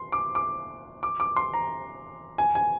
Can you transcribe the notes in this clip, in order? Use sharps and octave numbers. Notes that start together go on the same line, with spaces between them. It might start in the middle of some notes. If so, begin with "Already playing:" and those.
Already playing: C6
D6
D6
D6
D6
C6
A#5
G#5
G#5